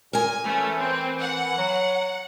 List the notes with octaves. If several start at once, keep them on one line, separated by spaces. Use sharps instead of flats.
A#2 A#4 G#5
E3 A3 C#4
C4
F#5
F#3